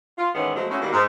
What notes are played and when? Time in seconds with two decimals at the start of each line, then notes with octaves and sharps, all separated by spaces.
0.18 F4
0.35 G#2 D#3 E3 G#3 B3 C#4
0.56 B2 F3 F#3 G#3 A3
0.70 G#3 A3 C#4 E4 F#4
0.81 B2 D#3 F#3 G3 A#3
0.93 G#2